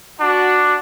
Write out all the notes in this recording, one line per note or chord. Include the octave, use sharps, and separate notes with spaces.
D4 F#4